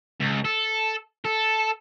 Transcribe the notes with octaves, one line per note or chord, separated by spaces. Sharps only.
C#2
A4
A4